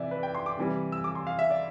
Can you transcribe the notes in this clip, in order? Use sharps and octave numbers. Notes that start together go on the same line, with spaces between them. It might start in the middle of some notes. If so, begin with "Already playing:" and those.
Already playing: C3 E3 D5 E5
B4
G5
C6
D6
C3 E3 G3
E6
D6
C6
F5
E5
D5